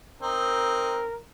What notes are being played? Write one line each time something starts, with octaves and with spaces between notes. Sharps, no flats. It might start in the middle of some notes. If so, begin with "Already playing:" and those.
C4 D#4 A#4